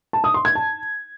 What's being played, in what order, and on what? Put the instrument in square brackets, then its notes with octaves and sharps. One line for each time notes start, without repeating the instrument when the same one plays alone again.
[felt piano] A5
D#6
C6
G#6
A5